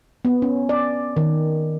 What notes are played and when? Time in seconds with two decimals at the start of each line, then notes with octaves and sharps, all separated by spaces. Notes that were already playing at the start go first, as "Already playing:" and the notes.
0.25 B3
0.42 C#4
0.69 D5
1.16 D#3